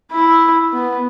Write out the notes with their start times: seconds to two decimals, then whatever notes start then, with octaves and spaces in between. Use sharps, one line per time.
0.12 E4
0.73 B3